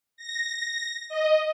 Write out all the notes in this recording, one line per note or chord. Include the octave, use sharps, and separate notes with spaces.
A#6
D#5